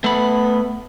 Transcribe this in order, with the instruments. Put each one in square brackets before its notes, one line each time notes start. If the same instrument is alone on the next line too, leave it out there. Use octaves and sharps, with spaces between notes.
[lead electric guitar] A3 B5 [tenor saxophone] B3